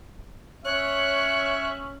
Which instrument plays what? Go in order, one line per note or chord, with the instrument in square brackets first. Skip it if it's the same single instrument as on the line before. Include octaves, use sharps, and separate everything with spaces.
[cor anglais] C#4 [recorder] C#5 [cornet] E5 [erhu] F#6